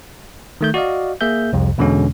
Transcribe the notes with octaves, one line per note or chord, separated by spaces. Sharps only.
D#3 A3 G6
F#4 D5 D#5 F5
A#3 G#4 E5 G6
C2 F2 C3
E2 B2 D3 G#3 C#4